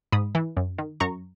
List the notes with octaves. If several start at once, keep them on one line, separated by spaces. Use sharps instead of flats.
G#2 B5 D#6
E3
F#2
D#3
F#2 A#5 C#6